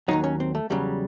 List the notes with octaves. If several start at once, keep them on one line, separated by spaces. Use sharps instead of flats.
D#2 D#3 F#3 D#4
C#4
C4
A3
E2 C#3 F#3 G3